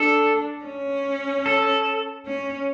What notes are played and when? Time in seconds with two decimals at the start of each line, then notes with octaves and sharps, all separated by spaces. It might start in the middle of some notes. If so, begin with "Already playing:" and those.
Already playing: D4 A4
0.64 C#4
1.46 A4
2.26 C#4